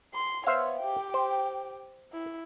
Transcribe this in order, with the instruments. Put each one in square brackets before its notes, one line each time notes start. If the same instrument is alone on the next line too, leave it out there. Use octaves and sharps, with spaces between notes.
[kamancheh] C6
[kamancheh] B3 C#5 [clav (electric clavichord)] C5 E5 F5
[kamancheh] G4 G5
[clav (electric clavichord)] C5
[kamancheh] E4